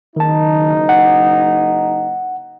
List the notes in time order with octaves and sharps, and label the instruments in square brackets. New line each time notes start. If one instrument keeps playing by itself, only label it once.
[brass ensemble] F#1 D#4 [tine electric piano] D#3 A5
[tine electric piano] F#5